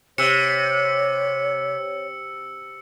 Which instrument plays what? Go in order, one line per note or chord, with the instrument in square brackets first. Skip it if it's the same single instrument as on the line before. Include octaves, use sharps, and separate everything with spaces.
[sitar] C3 [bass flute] C#5 [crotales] E6 C#7